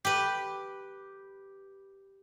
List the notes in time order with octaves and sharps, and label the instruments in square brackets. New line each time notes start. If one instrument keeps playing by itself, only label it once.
[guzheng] G4 B4